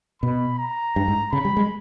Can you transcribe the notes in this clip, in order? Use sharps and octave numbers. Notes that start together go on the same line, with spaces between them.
B2 B5
A#5
G2
G#2
C#3 B5
G3
G#3